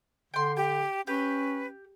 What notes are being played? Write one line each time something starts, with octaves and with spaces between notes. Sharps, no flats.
D3 G5 C6
G4 G5
C#4 G4 B4